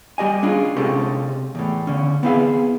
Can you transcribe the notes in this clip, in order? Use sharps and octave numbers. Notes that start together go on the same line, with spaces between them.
G3 G4 D#5 G#5
C#4 D4 F4 G#4
C3 G#3 C#4 G4 A4
E2 A2
D3 C#4
B3 C4 E4 G#4 F5